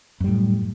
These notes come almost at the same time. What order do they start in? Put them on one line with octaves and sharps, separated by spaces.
F#2 G3 A2